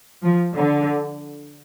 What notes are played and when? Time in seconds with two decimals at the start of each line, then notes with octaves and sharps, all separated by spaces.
0.23 F3
0.56 D3